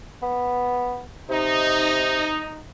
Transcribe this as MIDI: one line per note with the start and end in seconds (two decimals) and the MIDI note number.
0.22 1.02 59
1.29 2.34 48
1.29 2.60 63